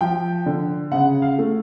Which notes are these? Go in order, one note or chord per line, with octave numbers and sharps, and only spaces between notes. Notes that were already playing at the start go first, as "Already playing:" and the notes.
F3 G5
D3
C#3 F#5
F5
A3